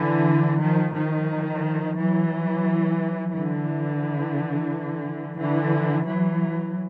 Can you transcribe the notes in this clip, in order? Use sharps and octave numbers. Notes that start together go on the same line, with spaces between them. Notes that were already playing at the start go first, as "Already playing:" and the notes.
Already playing: D3 E3
D#3 F3
D#3 F3
E3 F#3
D3 E3
D3 E3
E3 F#3